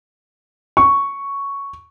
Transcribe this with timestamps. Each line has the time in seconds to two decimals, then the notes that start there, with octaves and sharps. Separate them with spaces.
0.77 C#6